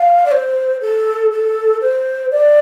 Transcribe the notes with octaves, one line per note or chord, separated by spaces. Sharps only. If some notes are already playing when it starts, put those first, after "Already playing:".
Already playing: F5
D5
C5
A4
A4
C5
D5